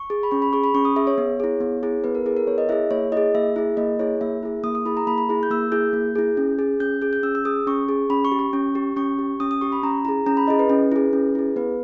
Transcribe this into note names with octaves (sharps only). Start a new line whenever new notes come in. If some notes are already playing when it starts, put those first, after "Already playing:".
Already playing: C#6
G#4
B5
C#4 C#6
B5
G#4 C#6
B5
C#4 C#6
D#6
G#4 E5
C#5
B3
E4 G#4
B3
E4 G#4
B3 B4
A#4
E4 G#4 B4
A#4
B3 C#5
D#5
E4 G#4 E5
A#3 C#5
E4 G#4 D#5
A#3 E5
E4 G#4
A#3 D#5
E4 G#4 C#5
A#3 E5
E4 G#4
A#3 D#6
D#6
E4 G#4 B5
A#5
A#3 B5
B5
E4 G#4
G6
A#3 E6
E4 G#4 G6
A#3
E4 G#4
C#4
G#4
C#4 G6
G#4 G6
G6
C#4 E6
E6
G#4 D#6
C#4 C#6
G#4
C#4 B5
C#6
G4
C#6
C#4
G4
C#4 C#6
G4
C#4 D#6
D#6
G4 C#6
B5
C#4 A#5
E4 G#4 A#5
C#4 A#5
B5
E4 G#4 D#5
B4
C#4
E4 G#4
C#4
E4 G#4
B3 B4